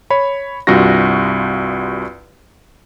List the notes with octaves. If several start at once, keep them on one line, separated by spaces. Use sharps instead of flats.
C#5 B5
C2 G2 F4 F#4 A#6